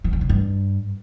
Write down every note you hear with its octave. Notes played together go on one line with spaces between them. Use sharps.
E3
D3
C#3
G2